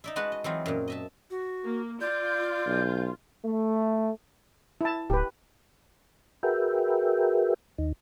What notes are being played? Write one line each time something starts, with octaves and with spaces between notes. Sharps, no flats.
D#4 D5 E5
G#3 F#4 B4 F#5 A5
D#5
E3 F#3 C4 D#4 F4
F#2 A#2
D#5 E5 A5
F#4
A#3
F4 D5 G6
B1
A3
E4 A5
D1 G4 B4
F#4 G#4 A#4 B4 E5 G5
D#2 D#4